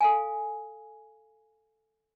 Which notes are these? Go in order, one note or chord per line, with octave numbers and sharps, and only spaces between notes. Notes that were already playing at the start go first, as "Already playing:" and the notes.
A4 F5 G#5